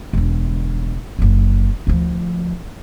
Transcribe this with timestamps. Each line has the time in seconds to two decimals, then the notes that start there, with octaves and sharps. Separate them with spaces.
0.13 E1 D3
1.19 F#1 F#3
1.87 D2 F3